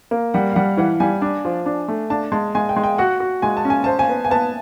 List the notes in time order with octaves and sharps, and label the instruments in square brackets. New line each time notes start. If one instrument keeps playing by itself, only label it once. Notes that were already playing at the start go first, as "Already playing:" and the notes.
[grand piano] A#3
[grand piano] G3 [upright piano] F#5
[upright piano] F5
[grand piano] G3 [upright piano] F#5
[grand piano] E3 [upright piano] F#5
[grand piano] G3 [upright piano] G#5
[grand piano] D4
F3
D4
A3
[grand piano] D4 [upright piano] A5
[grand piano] G#3 [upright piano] A5
[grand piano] G#3 [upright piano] G#5
[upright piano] G5
[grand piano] G#3
[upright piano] G5
[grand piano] F#4 [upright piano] F#5
[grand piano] F#4
[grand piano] G#3 [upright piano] G#5
[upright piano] A5
[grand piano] C#4
[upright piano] G#5
[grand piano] C5 [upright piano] A5
[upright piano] G#5
[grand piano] B3
[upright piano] G#5
[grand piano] B3 [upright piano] A5